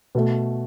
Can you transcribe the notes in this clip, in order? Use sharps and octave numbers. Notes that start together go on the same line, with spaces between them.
B2 A3